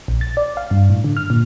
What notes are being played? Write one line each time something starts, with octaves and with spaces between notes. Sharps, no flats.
A#1
A6
D5
F5
G2
A2
D3
F6
A#2